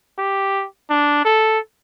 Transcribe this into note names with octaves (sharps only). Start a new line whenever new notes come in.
G4
D4
A4